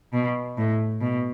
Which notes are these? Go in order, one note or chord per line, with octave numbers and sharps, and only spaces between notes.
B2
A2
B2